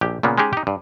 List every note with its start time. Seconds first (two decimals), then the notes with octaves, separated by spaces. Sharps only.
0.01 A#1 G4
0.23 A#2 C#3 A#3 B3
0.38 G#3 C#4 D#4 G4 G#4
0.53 D#4 G4
0.67 G2